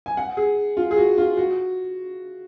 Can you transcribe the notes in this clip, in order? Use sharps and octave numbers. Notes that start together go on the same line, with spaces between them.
G#5
F#5
G#4
F4
G#4
F#4
F4
F#4